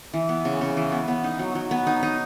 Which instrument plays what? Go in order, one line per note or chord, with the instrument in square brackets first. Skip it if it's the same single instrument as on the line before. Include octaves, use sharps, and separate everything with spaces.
[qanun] E3
B3
C#3
C#3
E3
B3
B3
D#4
F#3
F#3
B3
D#4
D#4